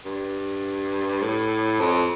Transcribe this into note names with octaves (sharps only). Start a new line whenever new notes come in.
G2
A2
F2